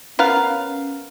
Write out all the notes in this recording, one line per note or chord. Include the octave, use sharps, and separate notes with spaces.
B3 C#4 A#4 F5